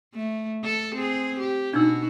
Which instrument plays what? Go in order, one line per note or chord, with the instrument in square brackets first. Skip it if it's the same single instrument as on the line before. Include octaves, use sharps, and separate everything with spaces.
[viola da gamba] A3
A4
C4 G#4
G4
[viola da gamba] B2 F#4 [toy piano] D4 D#4 E6